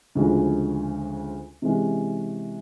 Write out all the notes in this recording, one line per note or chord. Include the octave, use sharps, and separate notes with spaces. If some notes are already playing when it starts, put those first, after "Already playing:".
D2 C#3 F3 G#3
C3 E3 G#3 C#4